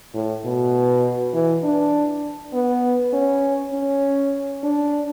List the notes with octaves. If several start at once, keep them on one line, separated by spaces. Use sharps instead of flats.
A2
B2
E3
D4
B3
C#4
C#4
D4